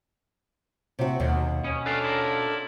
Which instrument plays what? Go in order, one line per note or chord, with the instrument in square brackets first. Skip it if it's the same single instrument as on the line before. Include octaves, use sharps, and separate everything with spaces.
[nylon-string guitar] C3 F#4
[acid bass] D#2 [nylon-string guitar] B2
[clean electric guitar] B3 [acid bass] C#4
[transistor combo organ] D4 A4 [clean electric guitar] B4 D5 F5
[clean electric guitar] E4 F4 A#4